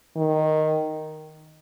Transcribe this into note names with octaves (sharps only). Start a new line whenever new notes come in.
D#3